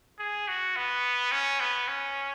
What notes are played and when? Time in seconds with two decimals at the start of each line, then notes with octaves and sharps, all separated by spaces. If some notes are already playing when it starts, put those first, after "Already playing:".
0.19 G#4
0.48 F#4
0.76 B3
1.32 C#4
1.61 B3
1.88 C#4